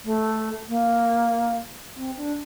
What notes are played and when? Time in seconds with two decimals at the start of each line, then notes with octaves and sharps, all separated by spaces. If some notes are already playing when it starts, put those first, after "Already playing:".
0.04 A3
0.68 A#3
1.95 C4
2.16 D4